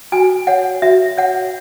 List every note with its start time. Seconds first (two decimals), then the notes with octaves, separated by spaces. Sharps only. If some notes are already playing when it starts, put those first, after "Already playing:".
0.12 F#4 G#5
0.47 C#5 F#5
0.82 F#4 E5
1.17 C#5 F#5